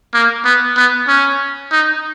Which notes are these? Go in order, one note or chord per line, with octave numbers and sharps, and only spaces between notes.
A#3
B3
B3
C#4
D#4